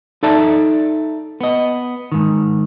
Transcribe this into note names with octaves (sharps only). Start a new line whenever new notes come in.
D#4 A4 D5 E5 A5
B3 D#5
G#2 D#3